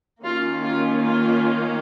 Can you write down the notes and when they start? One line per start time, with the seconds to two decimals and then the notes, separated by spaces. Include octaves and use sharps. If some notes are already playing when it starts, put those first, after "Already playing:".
0.23 D#3 A#3 C#4 F4
0.63 F4
1.03 F4